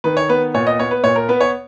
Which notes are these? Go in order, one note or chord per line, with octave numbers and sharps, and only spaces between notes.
D#3 B4
C#5
B3 B4
A#2 C#5
D#5
B3 C#5
B4
A#2 C#5
A#4
B3 B4
C#5